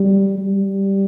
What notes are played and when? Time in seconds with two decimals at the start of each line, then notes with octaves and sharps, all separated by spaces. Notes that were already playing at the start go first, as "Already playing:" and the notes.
Already playing: G3
0.38 G3